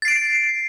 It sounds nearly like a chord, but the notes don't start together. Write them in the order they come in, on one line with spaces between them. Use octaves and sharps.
A6 C7 D7